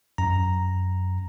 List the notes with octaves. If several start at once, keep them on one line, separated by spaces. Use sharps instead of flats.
F#2 A#5